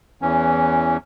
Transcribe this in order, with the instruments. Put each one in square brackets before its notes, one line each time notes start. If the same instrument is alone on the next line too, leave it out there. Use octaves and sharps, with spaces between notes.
[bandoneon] E2 E3 C#4